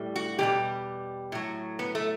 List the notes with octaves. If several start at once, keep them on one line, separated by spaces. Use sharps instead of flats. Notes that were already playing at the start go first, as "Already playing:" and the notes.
Already playing: A2 G3
F#4
E2 B2 G3 G4
A2 F#3
B3
A3